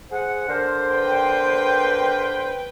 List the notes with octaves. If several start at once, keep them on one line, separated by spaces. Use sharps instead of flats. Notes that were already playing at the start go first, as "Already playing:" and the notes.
G#4 C5 F#5
D3 A#4 C5
B4 G5